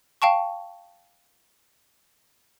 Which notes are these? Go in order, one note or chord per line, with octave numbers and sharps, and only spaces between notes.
F5 G5 A5 C#6